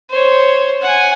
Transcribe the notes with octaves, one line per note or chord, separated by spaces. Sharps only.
C5 C#5
F#5 G#5